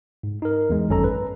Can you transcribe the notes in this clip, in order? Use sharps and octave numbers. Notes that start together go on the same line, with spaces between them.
G#2
D#4 A#4
E2 G#3
G#1 F#2 C#4 A4 A#5
B4